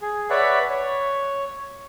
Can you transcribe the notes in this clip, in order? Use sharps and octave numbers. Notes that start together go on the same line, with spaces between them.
G#4
B4 C#5 D5 E5 F#5 B5
C#5